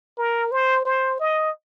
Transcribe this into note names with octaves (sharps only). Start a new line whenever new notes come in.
A#4
C5
C5
D#5